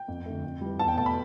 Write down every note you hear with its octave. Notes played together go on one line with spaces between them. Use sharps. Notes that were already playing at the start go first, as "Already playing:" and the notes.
Already playing: G5
F2
D3 A3
F2
E3 G3
E2 A5
G5
B2 A3 A5
B5